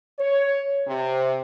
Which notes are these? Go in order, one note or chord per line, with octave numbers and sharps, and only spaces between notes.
C#5
C3